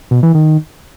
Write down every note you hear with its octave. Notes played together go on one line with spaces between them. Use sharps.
B2
E3
D#3